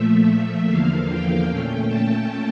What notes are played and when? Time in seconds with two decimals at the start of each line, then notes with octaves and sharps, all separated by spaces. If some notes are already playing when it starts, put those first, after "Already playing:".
Already playing: A#2 F3 A3 E5
0.68 E2 D3 F3 A#3 F5
1.09 G5
1.47 A#2 A3 C#4
1.87 A5